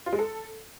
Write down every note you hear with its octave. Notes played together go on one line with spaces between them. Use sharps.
F4
G#3
A4